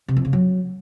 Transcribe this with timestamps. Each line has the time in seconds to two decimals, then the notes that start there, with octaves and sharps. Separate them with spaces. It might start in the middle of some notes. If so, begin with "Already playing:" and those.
0.08 C3
0.17 F2
0.25 C#3
0.33 F#3